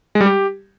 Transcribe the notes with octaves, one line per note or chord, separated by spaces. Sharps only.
G#3
G3
G4